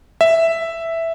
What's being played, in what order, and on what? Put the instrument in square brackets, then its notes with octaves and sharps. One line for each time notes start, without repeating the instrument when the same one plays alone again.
[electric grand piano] E5